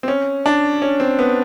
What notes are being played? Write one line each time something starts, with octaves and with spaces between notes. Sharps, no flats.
C4
C#4
D4
C#4
C4
B3